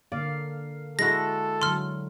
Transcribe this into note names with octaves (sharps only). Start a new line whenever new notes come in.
D3 A#3 D5 F5
G#3 E4 F#4 A4 A#6
D3 F#3 C6 F6